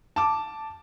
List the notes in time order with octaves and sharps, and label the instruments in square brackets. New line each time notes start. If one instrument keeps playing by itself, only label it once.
[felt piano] A5 D6